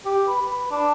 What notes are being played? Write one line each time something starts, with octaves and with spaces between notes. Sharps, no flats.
G4
B4
B4
D4